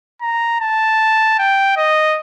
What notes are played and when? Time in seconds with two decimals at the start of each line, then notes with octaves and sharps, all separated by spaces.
0.22 A#5
0.60 A5
1.39 G5
1.77 D#5